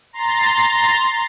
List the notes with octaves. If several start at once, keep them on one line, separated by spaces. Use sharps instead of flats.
A#5 C6 A6